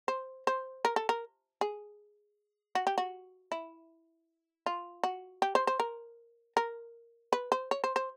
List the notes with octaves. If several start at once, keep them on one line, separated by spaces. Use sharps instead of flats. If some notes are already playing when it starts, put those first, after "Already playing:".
C5
C5
A#4
A4
A#4
G#4
F#4
G4
F#4
E4
F4
F#4
G4
C5
C5
A#4
A#4
B4
C5
C#5
C5
C5